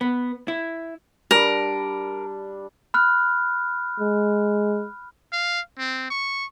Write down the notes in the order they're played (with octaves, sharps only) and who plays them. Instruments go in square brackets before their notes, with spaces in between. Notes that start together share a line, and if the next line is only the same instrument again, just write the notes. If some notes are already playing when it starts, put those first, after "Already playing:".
[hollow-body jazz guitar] B3
E4
[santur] G3 D4 [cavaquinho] A#4
[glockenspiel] B5 F6 F#6
[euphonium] G#3
[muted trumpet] F5
C4
C#6